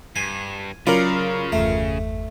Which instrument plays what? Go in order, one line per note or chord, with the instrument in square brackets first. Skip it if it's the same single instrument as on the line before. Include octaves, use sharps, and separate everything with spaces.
[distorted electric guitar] G2 [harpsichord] G#5
[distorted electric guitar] C#3 [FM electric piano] F#3 C#4 B5 [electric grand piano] F4 A#4 [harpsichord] D5
[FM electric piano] G1 E2 [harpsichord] A3